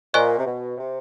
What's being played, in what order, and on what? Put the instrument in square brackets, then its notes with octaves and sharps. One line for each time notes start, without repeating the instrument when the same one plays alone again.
[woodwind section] A#2 [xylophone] C5 D#5 G#5 C#6 F#6
[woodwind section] C3
B2
C3